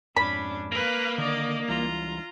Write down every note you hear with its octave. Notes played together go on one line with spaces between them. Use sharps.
F2 G#2 C#4 D4 B5
A#3 B4 F5
D3 D#3 D5 D#5
C#2 E3 G3 F4 A#5